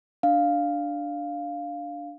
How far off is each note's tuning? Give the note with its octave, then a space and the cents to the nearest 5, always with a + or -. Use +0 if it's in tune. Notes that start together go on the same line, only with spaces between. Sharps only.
D4 +0 F5 +0